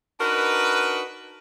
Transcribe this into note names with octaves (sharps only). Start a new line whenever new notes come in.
D4 D#4 F#4 A#4 B4